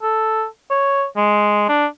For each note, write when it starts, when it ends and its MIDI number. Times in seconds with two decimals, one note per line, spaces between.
0.02 0.45 69
0.70 1.05 73
1.17 1.65 56
1.69 1.86 62